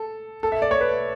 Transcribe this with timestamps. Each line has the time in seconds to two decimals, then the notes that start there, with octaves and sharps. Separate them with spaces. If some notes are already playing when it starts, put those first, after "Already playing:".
Already playing: A4
0.43 A4
0.52 E5
0.62 D5
0.71 C#5
0.81 B4